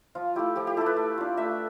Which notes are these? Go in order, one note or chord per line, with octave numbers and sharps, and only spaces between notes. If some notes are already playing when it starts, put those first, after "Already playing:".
F3 F4
A3 E4 G4
F3 G4
G4
A3 E4 A4
B4
A3
D4 F4
A3 E5